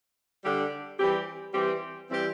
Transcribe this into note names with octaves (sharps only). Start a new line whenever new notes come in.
D3 G3 D4 G4
E3 G3 C4 G4
E3 G3 C4 G4
E3 G3 C4 G4